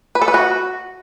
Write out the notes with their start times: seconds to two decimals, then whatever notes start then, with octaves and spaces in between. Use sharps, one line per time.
0.15 B4
0.22 A4
0.28 B4
0.34 F#4